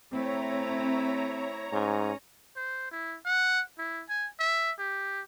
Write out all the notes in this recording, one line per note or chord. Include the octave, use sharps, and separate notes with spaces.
A3 C4 E4 C#5 A#5
G#2 C#4
C5
E4
F#5
E4
G#5
E5
G4